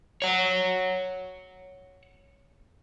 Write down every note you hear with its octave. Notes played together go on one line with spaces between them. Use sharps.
C#5 F#5